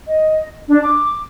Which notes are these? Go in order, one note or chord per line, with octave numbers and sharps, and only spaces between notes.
D#5
D4
D6